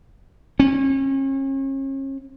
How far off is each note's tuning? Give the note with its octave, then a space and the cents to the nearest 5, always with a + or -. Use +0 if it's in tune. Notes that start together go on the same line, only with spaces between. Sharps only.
C#4 -40